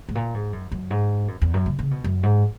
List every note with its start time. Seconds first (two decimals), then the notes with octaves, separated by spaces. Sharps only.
0.09 G#2
0.15 A#2
0.34 G#2
0.53 F#2
0.72 F#2
0.90 G#2
1.28 F#2
1.42 E2
1.54 F#2
1.66 C#3
1.79 C#3
1.91 B2
2.04 F#2
2.23 G#2